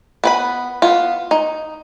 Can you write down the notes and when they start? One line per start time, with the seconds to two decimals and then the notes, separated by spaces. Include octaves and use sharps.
0.24 B3 B4 B5
0.82 B3 F4
1.31 D#4